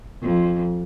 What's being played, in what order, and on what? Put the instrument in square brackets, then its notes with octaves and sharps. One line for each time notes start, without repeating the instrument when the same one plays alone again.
[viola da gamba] F2